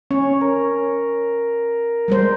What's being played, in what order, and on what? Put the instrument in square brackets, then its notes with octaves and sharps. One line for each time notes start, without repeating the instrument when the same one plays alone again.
[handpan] C#4 [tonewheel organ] C#5
[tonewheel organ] A#4
[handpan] G3 G#3 C5